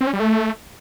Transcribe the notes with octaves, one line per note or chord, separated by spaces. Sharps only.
C4
C#4
G3
A3